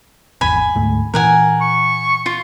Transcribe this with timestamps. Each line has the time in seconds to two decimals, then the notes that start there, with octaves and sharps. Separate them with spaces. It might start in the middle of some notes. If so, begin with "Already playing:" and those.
0.41 G#1 E2 G#5 B5
0.75 D2 G#2 A3
1.14 A#2 E3 A#4 F#5 G#5
1.61 C#6
2.26 F4